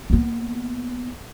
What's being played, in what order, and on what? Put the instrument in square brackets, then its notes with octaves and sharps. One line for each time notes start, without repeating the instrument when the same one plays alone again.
[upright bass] A#3 B3